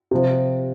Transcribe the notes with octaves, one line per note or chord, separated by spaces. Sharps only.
C3 F3